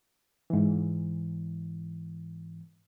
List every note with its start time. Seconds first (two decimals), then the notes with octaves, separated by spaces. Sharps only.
0.50 G#2 E3